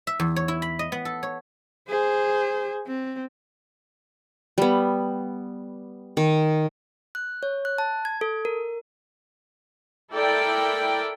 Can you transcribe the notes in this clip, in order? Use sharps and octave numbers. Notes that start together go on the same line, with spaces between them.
E5
E2
C#5
E4
B5
D#5
B3
A4
C#5
G#4 C5
C4
G3 B3
D#3
F#6
C#5
F#6
A5
G#6
A4
A#4
E4 A4 A#4 D5 G5